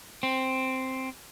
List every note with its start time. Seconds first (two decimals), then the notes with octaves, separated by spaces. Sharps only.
0.23 C4